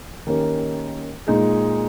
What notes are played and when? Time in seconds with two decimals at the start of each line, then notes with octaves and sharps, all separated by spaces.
0.27 D#3 A#3 C#4 G4
1.27 A#2 G#3 D#4 G#4